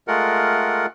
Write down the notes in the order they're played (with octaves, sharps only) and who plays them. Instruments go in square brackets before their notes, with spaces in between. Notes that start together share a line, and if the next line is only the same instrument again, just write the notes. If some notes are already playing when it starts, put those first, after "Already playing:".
[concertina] G#3 A3 F4 A#4 F#5